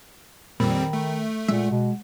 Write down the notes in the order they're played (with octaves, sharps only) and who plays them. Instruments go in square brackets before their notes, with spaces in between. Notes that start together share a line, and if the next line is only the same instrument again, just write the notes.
[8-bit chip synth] F2 G3 C4 [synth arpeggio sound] A#2 [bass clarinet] D#3 [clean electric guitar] B5
[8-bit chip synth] A3
[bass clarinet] A#2 [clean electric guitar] G#3 F#5 [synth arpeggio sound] E5
[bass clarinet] B2